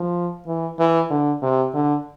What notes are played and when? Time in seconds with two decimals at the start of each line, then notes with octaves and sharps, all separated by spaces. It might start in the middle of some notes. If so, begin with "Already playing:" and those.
Already playing: F3
0.47 E3
0.79 E3
1.10 D3
1.42 C3
1.74 D3